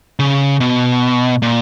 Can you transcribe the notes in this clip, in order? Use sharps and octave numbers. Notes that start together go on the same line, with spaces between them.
C#3
B2
A#2